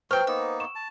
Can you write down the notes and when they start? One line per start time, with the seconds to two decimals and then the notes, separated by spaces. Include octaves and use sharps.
0.11 F#3 B4 C5 G5 C#6 F6
0.27 A#3 B3 D#4 E6
0.60 C#6 E7
0.75 A5